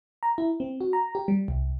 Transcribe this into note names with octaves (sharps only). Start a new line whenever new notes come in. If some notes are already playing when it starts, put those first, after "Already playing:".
A#5
E4
C4
F#4
A#5
G4
G3
C2